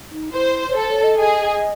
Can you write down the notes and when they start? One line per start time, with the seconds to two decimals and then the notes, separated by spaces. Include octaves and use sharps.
0.11 D#4
0.33 E4 C5
0.68 C#5
0.75 A4 C5
0.90 C#5
1.04 D#5
1.18 G#4 D#5